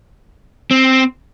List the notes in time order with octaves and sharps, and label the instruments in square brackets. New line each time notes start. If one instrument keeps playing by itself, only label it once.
[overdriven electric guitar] C4